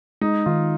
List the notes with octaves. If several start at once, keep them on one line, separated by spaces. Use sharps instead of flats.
G#3 D#4
D#3 F4